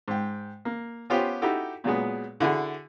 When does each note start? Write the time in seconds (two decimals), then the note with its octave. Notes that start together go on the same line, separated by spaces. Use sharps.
0.08 G#2 G5
0.65 A#3
1.10 B3 C#4 F4 G4 C5 G5
1.42 D#4 E4 F#4 G4 A4
1.84 A#2 F#3 G#3 B3
2.40 D3 E4 F#4 G#4